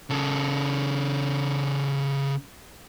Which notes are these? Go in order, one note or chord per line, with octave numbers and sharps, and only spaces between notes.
C#3 A4